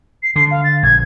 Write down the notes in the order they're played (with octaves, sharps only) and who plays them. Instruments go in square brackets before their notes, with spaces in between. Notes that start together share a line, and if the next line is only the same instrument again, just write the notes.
[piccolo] C7
[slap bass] D3 [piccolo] C7
[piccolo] F5
A6
[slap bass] A#1 [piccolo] G#6